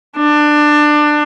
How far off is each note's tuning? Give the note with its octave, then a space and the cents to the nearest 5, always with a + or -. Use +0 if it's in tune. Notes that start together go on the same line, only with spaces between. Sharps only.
D4 +20